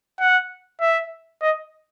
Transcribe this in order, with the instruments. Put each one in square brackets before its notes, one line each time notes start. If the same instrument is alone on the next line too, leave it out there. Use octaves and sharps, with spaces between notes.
[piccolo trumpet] F#5
E5
D#5